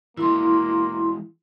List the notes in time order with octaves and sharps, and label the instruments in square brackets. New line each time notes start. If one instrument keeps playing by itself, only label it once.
[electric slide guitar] E3 G#3 [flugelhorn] A#3 [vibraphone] E4 C6